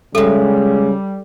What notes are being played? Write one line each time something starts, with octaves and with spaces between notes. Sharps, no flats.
C#3 G3 G#3 A4 E5